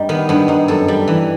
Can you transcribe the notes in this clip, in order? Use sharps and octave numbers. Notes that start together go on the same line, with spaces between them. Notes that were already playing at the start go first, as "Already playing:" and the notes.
Already playing: G2 G3 D#4
D#3 B3
G2 B3
G2 D#4
F#2 A4
G3
E3